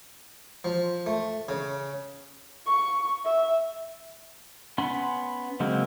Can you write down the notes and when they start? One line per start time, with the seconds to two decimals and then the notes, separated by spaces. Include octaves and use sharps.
0.64 F3
1.06 A3
1.49 C#3
2.66 C#6
3.25 E5
4.78 B3 C#4 B5 C6
5.60 C#3 F#3 G#3 A#3 C4